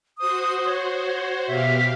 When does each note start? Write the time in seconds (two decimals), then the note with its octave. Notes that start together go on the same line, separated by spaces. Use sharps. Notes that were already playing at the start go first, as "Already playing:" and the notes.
0.18 F#4 C5 D#6
0.66 C#5
1.47 B2 G4 E5 F5